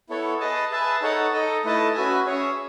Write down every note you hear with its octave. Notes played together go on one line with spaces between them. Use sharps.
B3 E4 A4 C#5
G#4 B4 D#5 A5
G#4 B4 E5 A5
D#4 A4 C#5 F#5 A5
D#4 A4 D#5
A3 E4 B4 D#5 A5
C#4 F#4 B4 E5 G#5
C#4 G#4 C#5 E5